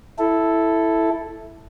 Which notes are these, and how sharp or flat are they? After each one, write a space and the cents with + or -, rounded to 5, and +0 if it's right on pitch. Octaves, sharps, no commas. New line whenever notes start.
E4 +0 A4 +0